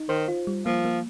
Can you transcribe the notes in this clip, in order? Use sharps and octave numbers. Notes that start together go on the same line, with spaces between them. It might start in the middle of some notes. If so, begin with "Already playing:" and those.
Already playing: D#4
D#3 C5
F4
G3
F3 A#3
A#3